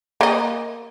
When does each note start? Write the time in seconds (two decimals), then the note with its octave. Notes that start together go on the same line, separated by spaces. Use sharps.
0.21 A#3 D#5